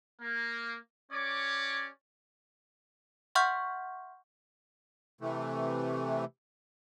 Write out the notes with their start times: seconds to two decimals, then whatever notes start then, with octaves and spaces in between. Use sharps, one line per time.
0.21 A#3
1.12 C#4 G4 C#5 D5 D6
3.35 E5 F#5 C6 C#6 F6 G6
5.21 C3 E3 A3